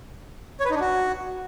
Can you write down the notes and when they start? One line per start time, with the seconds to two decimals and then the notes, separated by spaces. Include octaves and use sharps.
0.60 C#5
0.65 B4
0.70 D#4
0.76 D4
0.81 F#4